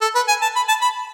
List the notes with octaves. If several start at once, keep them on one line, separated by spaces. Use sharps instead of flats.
A4
B4
G#5
A5
B5
A5
B5